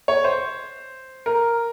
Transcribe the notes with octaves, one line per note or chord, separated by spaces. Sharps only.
C#5
C5
A#4